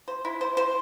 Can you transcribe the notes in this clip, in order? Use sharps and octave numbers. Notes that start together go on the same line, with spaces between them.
C5
E4
C5
C5